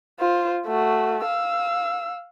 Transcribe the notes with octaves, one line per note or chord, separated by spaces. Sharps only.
F4 C5
A3 F#4
F5 E6